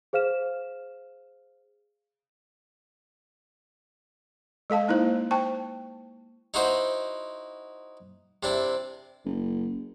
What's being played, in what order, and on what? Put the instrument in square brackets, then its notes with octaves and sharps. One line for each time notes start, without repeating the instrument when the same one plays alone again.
[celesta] G#4 C5 F5 F6 E7
[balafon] G#3 A4 F5 A5
A#3 D#4 E4 C5
C5 G5 A5 C#6
[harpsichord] D#4 E4 F#4 C5
C3 D4 E4
[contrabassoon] F#1